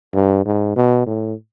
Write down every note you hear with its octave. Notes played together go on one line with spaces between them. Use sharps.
G2
G#2
B2
A2